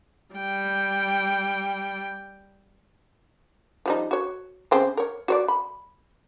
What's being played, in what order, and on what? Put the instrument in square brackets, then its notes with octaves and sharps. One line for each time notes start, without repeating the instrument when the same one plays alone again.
[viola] G3 G5
[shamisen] F3 G3 D#4
F#4 C#5
C#3 C4 C#4
A#4 C#5
F#4 C#5 D5
B5